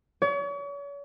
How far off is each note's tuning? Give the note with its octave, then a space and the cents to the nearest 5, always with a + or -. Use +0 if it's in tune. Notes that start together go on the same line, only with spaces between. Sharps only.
C#5 +40